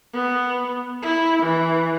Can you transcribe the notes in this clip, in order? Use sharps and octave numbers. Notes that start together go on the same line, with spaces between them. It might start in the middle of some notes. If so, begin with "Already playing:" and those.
B3
E4
E3